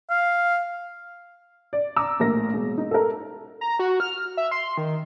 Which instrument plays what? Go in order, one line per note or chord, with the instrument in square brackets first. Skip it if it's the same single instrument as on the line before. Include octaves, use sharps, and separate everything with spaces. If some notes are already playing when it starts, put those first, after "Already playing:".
[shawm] F5
[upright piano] D5
A#5 D6 E6
A#1 A2 A#4 A#6
E1
D#4
A4 A#4
[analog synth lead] A#5
F#4
F6
E5
C6
D#3